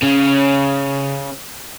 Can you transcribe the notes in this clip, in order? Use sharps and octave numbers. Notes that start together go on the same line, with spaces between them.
C#3 C#4